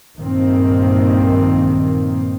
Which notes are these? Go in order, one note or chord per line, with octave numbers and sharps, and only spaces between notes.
A#1 G2 D#3 A#3 C4